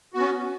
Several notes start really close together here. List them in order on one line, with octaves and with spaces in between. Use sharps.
F#4 B3 C#4